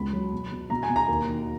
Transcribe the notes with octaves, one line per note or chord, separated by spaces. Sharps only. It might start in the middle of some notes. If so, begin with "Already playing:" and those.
Already playing: C#2 B3 B5
F#3
B2
B2
B2 A#5
G#5
B2
A#5
D#2
D#3